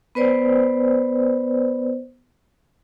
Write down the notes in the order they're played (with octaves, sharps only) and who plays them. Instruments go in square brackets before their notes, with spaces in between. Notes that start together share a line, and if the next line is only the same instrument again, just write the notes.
[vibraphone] B3 B4 C5 D5